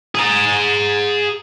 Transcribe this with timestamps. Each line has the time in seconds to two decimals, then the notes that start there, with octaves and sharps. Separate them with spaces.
0.15 G#4 A#5